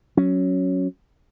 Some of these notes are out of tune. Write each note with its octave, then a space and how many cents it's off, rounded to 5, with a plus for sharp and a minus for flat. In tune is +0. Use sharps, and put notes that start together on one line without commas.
F#3 +0 C#4 +0